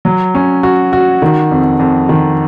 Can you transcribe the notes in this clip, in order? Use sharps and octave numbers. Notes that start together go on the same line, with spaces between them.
F#3
C#4
F#4
F#4
D#3
F2
F2
D#3